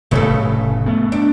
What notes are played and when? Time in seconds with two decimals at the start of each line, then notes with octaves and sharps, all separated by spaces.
0.11 F1 A2 C#3 E3 A3 A4
0.86 A3 B3
1.12 D4